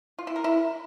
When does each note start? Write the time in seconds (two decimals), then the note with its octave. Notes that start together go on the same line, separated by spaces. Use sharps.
0.19 F4
0.27 E4
0.36 A#4
0.44 E4